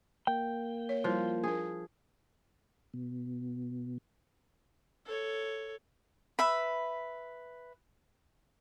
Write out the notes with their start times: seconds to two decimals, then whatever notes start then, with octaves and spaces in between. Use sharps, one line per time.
0.27 A#3 G5
0.89 C#5
1.04 F3 G3 E4 F#4
1.43 D4 G#4 A#4
2.94 B2
5.05 A4 C#5
6.39 B4 E5 B5